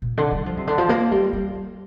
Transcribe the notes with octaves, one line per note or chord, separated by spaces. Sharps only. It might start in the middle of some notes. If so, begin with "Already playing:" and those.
A#2
D3
G3
F3
C3
D3
F3
A#3
G3
G3